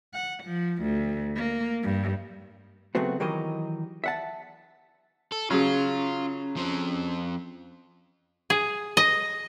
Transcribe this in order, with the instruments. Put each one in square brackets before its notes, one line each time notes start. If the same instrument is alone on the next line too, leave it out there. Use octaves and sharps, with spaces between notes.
[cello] F#5
F3
D2
A#3
G2
[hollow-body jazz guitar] C#3 F#3 A3 B3 C4 F#4
D#3 E3 F#3 G4 A#4 D#5
E5 F#5 A5
[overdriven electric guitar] A4
[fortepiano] C#3 F#3 [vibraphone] C#4 [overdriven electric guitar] F4
[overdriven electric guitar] F3 C4
[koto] G#4
D#5